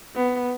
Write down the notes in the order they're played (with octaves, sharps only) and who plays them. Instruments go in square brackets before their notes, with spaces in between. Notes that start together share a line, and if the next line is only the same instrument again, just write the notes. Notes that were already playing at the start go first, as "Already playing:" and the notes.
[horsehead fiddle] B3